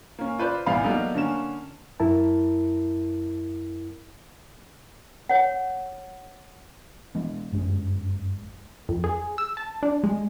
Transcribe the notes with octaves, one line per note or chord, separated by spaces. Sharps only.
A#3 C#4
F4 B4 C5 D5
A1 E2 G3 B3 F5 B5
F#3 G3 A#3 B3 D#4 A4
D3 A#3 C#4 E7
F#2 E4 A#4 A5
C#5 F#5
E3 G#3 B3
G1 F#2 G#3
F2
G#4
E6
A5
D4
G#3